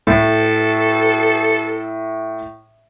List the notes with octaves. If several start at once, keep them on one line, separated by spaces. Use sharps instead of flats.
A2 A4